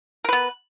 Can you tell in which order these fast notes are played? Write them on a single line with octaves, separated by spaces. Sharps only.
A#4 B4 B3